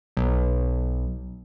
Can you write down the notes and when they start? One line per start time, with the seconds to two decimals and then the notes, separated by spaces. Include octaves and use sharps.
0.17 B1